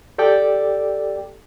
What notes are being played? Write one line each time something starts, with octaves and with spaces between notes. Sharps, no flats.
G4 A4 D5 G5 D6